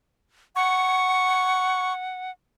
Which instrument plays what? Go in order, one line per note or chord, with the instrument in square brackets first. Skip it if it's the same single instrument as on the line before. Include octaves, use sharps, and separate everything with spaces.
[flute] F#5 [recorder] C#6